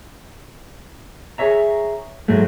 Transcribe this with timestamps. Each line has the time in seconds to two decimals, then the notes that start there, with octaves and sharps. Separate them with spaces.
1.38 G#4 A4 C#5 E5 A#5
2.28 G#2 F#3 G#3 A3